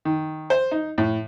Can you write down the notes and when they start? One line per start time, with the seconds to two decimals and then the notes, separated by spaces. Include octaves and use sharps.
0.05 D#3
0.50 C5
0.72 D#4
0.98 A2